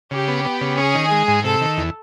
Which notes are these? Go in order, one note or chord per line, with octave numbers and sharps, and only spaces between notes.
C#3 G4
B3
B3
C#3
C#4 G#4
D#3
G#3
G#2
C3 A4
D#3
E2